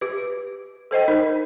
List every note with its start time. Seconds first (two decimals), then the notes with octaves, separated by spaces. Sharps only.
0.01 G4 B4
0.91 A4 C5 D#5 G5
1.08 D#4 A#4